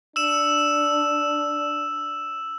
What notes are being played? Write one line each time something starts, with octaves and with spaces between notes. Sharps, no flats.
D4 E6 E7